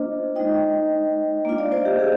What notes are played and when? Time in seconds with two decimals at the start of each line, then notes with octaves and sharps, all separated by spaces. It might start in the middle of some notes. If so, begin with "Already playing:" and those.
Already playing: A#3 D4 F4 C5 D#5
0.36 G#3 D#4 D#5 G5
1.45 A#3 D4 F4
1.58 D5 F5
1.72 C5 D#5
1.85 G4
1.99 G#4